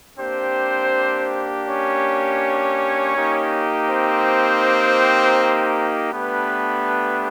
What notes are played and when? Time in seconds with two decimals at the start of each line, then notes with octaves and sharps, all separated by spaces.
0.18 A#3 C4 D4 G4 C5
1.67 C#4 C#5
3.15 A#3 D#4 G4
3.90 C4 C5
6.12 A3 B3 D4 G4 B4